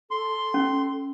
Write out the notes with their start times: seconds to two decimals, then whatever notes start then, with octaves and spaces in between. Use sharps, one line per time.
0.11 A4 C6
0.54 C#4